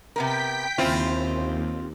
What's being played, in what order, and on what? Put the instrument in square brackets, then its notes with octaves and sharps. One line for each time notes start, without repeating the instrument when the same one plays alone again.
[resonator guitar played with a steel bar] C3 B3 A#4 [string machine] G5 G6 B6
[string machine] D#2 [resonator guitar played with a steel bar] C#3 E4 [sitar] C4 F4